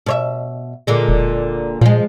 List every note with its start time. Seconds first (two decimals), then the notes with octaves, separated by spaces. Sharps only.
0.06 B2 C#5 E5
0.87 A#2 D3 G#3
1.09 E1
1.81 A#2 F3 G#3